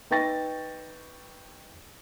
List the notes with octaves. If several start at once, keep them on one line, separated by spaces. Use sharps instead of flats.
D#4 B4 G5 C#6 A6 A#6